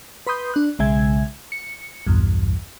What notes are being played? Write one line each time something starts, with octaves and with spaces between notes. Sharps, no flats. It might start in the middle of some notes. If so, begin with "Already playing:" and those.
B4 B5 C6 D#6 G6
D4 F#6
B1 C#3 G#3 E5 G#5 G#6
C#7
B1 E2 G2